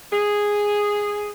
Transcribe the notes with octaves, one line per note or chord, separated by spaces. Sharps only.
G#4